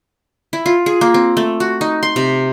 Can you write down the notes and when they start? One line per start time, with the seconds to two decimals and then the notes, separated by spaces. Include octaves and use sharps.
0.53 E4
0.66 F4
0.86 G#4
1.01 A#3
1.14 C4
1.37 A3
1.60 F#4
1.81 D#4
2.03 C6
2.16 C3